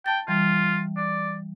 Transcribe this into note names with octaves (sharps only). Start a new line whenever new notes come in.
G5 A5 A6
E3 G3 F4
D5